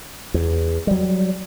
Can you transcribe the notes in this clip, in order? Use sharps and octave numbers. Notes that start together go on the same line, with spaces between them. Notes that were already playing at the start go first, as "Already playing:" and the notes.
E2
F#3 G3